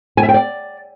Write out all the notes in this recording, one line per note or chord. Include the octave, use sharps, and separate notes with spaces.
G#5
E5
G5
D5